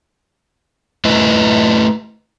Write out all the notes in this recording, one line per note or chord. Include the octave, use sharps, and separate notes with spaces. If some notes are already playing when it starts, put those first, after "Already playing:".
A3 E4 B4 D#5